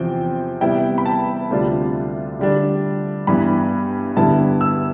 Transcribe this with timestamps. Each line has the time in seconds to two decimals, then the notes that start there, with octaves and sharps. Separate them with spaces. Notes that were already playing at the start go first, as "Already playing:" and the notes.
Already playing: E2 C3 F3 C4 G5
0.61 C3 G3 B3 E4 G5
0.98 B5
1.06 A5
1.50 D2 C3 G3 D4 F4
2.39 D3 G3 D4
3.27 G2 E3 B3 B5
4.16 G2 D3 G3 B3 E4 A5
4.61 E6